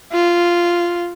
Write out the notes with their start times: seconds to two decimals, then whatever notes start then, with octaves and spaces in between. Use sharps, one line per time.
0.12 F4